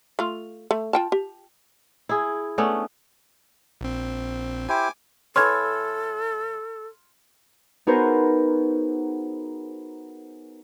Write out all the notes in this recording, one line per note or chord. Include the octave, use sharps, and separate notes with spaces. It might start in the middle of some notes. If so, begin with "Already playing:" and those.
A3 F4
A3
F4 G5 A5
G4
E4 G#4
A3 B3 C#4 D4
A#1 C4
E4 G4 C5 G#5 D6
E3 A4 C#5 C6 F6 G#6
B3 D#4 F#4 G#4 A#4 C5